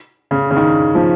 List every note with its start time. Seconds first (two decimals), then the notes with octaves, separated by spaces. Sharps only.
0.31 C#3
0.51 C#3
0.56 D#3
0.95 F3